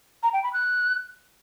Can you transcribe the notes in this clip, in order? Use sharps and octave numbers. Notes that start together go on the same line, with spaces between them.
A#5
G5
B5
F#6